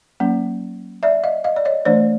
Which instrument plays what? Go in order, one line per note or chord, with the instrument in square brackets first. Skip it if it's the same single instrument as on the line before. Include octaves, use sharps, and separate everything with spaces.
[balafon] F#3 A#3 C#4
D5 E5
D#5 F5
D#5 F5
D5
C#5 D#5
E3 A3 D4 C5 D5